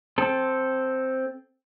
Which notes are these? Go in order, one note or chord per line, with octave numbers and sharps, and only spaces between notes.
C4 A4